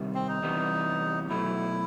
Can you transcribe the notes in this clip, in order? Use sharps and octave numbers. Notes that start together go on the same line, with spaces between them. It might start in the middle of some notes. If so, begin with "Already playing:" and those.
Already playing: C3 D#3 G3
C4
D#4
E2 C3 E3 G3 B3
B2 F#3 A3 E4